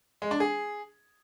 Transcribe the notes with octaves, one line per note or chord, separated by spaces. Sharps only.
G#3
D4
G#4